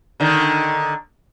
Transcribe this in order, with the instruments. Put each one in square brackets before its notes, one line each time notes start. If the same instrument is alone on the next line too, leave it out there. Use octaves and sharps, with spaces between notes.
[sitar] D3 D#3